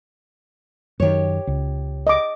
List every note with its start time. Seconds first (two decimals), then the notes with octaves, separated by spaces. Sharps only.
1.00 F#2 D#3 G4 C#5
1.47 C#2
2.07 D#5 D6